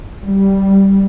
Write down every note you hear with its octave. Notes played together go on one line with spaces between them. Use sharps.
G3